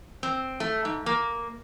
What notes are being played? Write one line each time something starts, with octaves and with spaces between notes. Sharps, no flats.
C4
A3
G#2
A#3